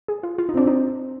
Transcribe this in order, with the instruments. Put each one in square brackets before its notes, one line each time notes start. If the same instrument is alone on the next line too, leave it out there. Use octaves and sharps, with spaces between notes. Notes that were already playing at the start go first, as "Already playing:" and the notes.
[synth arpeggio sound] G#4
F4
F4
D#4
[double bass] C4 [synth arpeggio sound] D4
[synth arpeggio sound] D#4